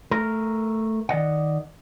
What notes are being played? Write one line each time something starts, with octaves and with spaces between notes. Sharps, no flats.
A3 A#4
D#3 D5 D#5 F#5